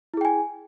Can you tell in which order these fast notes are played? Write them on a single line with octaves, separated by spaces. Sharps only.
E4 G#4 G5 G#5